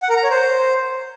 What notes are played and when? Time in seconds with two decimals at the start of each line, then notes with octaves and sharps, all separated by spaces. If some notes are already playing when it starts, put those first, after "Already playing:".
0.02 F#5
0.09 A#4
0.17 A#5
0.24 C#5
0.31 C5